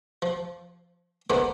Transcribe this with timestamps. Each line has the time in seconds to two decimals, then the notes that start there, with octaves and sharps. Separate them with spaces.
0.22 F3
1.30 D3 G#3 A#3 B3 E4 C5